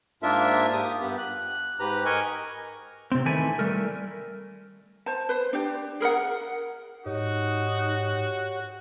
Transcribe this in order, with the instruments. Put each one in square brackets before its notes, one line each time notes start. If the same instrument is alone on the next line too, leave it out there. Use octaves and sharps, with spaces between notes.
[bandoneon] G#2 A#3 D4 F4 A#4 E5
G4 D#6
G2 B3 G4
F#6
G#2 G4 B4 A#5
A#4 D#5 G#5 C#6
[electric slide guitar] C3 C4
D#3 E3 A3 E4 G#5
G3 A3 A#4
[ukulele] C5 A5
B4 C5
D4 G4
G#4 A#4 B4 F#5
[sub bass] G#2 [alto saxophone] D#4 [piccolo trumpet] F#4 [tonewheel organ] G4 C#5